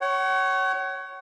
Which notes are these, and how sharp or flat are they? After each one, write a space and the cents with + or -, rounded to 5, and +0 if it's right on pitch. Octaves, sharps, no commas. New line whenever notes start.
C#5 +0 F#5 +40